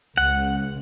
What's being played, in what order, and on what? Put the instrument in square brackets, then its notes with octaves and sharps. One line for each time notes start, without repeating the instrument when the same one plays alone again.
[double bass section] C#2 [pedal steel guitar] F#5